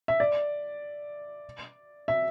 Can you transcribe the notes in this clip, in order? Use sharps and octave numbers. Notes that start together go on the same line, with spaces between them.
E5
D5
E5